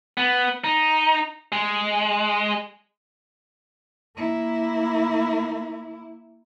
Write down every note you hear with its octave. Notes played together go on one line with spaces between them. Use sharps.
B3
D#4
G#3
A#3 E4